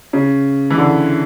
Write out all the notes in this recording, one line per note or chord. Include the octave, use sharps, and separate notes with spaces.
C#3
E3
D3